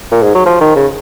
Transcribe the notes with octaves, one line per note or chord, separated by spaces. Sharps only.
A#2
G#2
F#3
F3
D#3
C#3